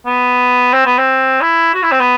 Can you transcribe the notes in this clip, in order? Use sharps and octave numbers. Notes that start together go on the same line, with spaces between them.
B3
C4
B3
C4
E4
F#4
E4
C4
B3